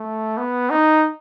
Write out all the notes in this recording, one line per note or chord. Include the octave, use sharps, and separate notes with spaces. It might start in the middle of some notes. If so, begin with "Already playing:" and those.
Already playing: A3
B3
D#4